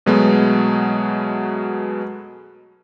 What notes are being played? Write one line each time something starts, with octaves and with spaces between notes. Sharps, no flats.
B2 F#3 G#3 A3 B3